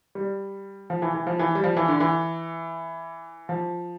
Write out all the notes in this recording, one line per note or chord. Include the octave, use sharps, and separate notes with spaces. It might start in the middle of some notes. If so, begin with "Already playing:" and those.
G3
F3
E3
E3
F3
E3
G3
F3
E3
D3
E3
F3